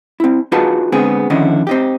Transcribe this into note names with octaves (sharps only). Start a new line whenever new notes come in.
C4 E4
D#4 F4 F#4 G#4 B4 A5
D3 G#3 B3 C4 G#4
F2 D3 D#3 C#4 E4 D#5
C4 D#4 G4